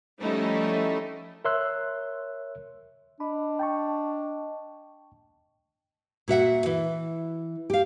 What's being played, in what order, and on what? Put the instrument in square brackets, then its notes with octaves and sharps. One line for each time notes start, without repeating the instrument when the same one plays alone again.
[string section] F3 G3 A3 C#4 D#4 E4
[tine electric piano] A#4 C#5 E5 C6 E6 F#6
[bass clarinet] D4 [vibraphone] D#5 [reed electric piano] B5
[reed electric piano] G5 A5 C#6
[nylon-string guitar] A#2 F#4 E5 F#5
E3
G4 F5